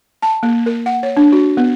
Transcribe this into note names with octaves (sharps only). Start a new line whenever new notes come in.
A5
A#3
A#4
F#5
C#5
D4
F#4
B3